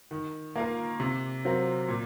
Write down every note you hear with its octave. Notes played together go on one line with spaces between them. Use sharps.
D#3
A#3 F4 A#4
C3
F#3 C4 F4 A#4
A#2